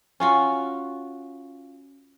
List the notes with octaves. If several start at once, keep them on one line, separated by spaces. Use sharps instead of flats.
C#4 F4 F#4